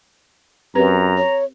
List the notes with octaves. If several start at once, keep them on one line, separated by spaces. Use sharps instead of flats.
F#2 C4 G4 B4 A#5
C#5